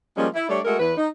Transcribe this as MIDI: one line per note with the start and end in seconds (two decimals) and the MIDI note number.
0.17 0.27 53
0.17 0.27 55
0.17 0.27 56
0.17 0.27 58
0.17 0.27 61
0.34 0.47 64
0.48 0.60 55
0.48 0.60 57
0.48 0.60 62
0.48 0.60 73
0.48 0.60 74
0.65 0.78 56
0.65 0.78 57
0.65 0.78 66
0.65 0.78 69
0.65 0.78 70
0.80 0.94 40
0.80 0.94 71
0.97 1.08 63